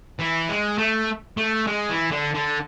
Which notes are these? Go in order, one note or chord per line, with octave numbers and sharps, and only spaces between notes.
E3
G#3
A3
A3
G#3
E3
D3
D3